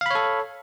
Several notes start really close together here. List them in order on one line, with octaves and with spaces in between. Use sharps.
F5 B5 C#5 A4